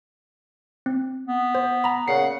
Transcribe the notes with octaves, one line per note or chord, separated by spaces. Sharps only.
C4
B3
C5
A#5 B5
A#2 C#3 F#5 C7